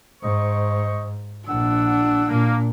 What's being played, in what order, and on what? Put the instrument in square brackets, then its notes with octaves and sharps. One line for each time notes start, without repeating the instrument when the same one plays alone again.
[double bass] G#2 [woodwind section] C5 D#5 C#6
[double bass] A#1 [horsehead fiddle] D4 [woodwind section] F#5 E6
[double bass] A#2 [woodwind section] A#3